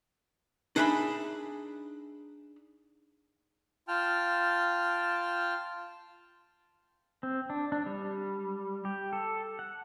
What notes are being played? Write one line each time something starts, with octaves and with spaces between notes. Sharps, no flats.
D4 D#4 G#4 E5 A#5 B5
F4 G5 A5 F6
C4
D4
D4
G3
G4
A4
F#5